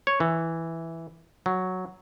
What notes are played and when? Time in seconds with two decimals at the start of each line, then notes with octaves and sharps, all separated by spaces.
0.07 C#5
0.20 E3
1.46 F#3